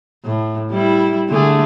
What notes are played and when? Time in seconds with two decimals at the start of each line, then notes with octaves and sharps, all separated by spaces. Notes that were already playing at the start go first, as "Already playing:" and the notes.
0.25 A2
0.71 G3 E4
1.29 D3 A3 G#4